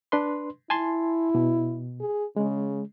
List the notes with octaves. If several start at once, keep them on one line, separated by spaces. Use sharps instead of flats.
D4 B4 C6
E4 G#5 A5 C6
B2
G#4
C#3 G#3